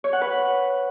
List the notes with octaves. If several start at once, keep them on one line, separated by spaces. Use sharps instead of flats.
C#5
F#5
B4